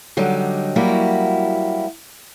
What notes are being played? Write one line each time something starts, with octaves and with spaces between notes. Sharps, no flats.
D3 F#3 G3 D#4
F#3 G3 A#3 E4 F#4